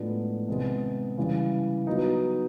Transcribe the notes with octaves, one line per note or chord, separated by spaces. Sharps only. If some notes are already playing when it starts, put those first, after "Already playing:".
Already playing: A2 F3 G#3 B3 D4
C3 D#3 G#3 B3
C#3 E3 G3
F#3 B3 D#4